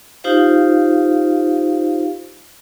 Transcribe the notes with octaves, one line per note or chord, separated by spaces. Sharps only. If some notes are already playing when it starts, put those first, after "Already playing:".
D#4 F4 G4 C5 F5